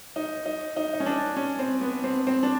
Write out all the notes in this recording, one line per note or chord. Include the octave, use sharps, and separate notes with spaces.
D#4
D#4
D#4
D#4
C#4
D4
C#4
C4
B3
C4
C4
D4